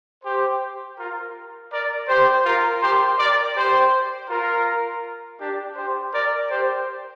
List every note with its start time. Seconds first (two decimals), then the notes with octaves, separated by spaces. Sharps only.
0.23 G4 C5
0.97 F4 A#4
1.71 A#4 D5
2.08 G4 C5
2.45 F4 A#4
2.81 G4 C5
3.18 A#4 D5
3.55 G4 C5
4.29 F4 A#4
5.40 D4 G4
5.76 G4 C5
6.13 A#4 D5
6.50 G4 C5